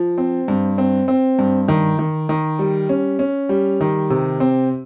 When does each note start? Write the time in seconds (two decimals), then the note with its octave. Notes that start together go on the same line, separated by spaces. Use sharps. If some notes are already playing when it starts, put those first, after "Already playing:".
Already playing: F3
0.18 C4
0.48 G2
0.78 C4
1.08 C4
1.39 G2
1.68 D#3
1.99 D#3
2.29 D#3
2.59 G3
2.89 C#4
3.19 C#4
3.49 G3
3.81 D#3
4.10 C3
4.40 C4